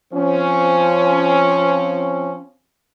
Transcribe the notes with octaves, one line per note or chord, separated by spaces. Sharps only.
F3 C4 C#4